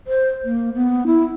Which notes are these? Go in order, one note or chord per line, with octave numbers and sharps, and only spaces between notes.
C5
A#3
B3
E4